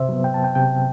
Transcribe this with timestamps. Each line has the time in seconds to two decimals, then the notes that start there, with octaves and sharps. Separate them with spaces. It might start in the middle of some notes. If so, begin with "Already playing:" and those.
Already playing: C3 C5 E5
0.09 F#3 B3
0.24 G5
0.34 A5
0.44 G5
0.55 C3 G5